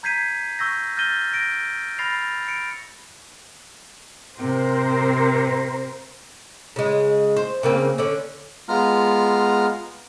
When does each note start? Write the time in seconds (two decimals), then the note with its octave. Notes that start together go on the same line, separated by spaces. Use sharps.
0.03 A#5 G6 G#6 B6 C7 D#7
0.59 C#6 E6 G6 A#6
0.97 F6 G6 A6 A#6 D#7 G7
1.34 A#6 D7
1.99 B5 F6 A6 A#6 C7 F7
2.48 C#7 D7
4.38 C3 A#4 C5
6.76 C#3 G#3
7.37 C5
7.63 C#3 A#3 C4
7.98 D3 C#4
8.69 G#3 B3 F4 A#5 F6